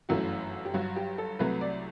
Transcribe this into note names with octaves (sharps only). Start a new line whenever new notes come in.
G1 F#2 E3 A3 F#4
G4
G1 G2 F#3 F#4
G4
A4
C2 C3 F#3 A3 B4
D5